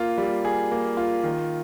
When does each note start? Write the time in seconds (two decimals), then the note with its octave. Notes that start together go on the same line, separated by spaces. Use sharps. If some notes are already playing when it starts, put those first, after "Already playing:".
Already playing: A#3 F4
0.18 G3
0.45 G#4
0.71 A#3
0.97 F4
1.24 D#3